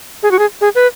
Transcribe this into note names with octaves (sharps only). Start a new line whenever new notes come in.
G#4
F#4
G#4
G#4
B4